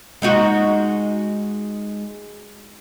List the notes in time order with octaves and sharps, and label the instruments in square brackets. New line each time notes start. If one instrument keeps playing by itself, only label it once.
[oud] G#3 D#4 F#4